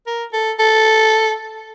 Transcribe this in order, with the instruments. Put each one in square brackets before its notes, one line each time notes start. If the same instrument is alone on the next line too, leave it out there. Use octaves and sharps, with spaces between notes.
[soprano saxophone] A#4
A4
A4